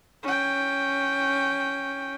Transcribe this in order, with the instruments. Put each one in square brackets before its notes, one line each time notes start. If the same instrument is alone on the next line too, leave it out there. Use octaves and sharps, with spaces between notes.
[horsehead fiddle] C#4 G5